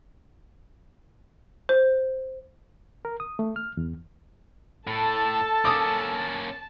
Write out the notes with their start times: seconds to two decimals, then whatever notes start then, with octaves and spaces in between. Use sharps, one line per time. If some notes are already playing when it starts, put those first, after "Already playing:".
1.69 C5
3.05 A#4
3.20 D#6
3.39 A3
3.56 F6
3.77 E2
4.87 A2 A4 A5
5.65 A#3 C#4 D6 D#6